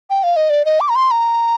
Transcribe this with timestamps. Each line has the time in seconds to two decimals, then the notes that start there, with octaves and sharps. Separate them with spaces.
0.10 G5
0.23 F5
0.36 D#5
0.50 D5
0.65 D#5
0.80 D6
0.89 A#5
0.95 C6
1.11 A#5